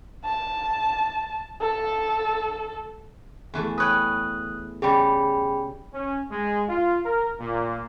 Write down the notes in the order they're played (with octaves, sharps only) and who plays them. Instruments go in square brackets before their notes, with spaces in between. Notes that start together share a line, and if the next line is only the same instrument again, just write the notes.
[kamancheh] A5
A4
[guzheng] E2 E3 A3
[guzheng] B4 C#5 G5 [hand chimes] D#6 F#6
[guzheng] C#3 G3 [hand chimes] G#4 G5 B5
[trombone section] C#4
G#3
F4
A#4
A#2